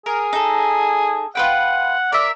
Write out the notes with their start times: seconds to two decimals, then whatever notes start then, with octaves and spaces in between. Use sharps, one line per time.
0.06 G#4 A#4
0.33 D#4 A4
1.35 F4 B4 F#5 G5
2.12 A#4 D5 E5